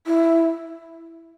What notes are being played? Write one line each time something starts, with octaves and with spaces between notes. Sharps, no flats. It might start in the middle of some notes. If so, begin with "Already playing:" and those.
E4